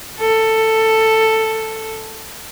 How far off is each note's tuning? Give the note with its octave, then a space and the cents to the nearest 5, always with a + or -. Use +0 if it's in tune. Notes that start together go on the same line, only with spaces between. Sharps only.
A4 +10